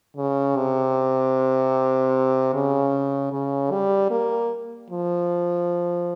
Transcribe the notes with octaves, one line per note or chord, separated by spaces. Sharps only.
C#3
C3
C#3
C#3
G3
A#3
F3